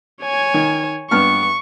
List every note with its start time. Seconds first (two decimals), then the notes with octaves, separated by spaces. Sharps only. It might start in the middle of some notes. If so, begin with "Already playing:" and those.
0.22 C#5 G#5
0.54 D#3
1.11 G2 B3 C#6 F6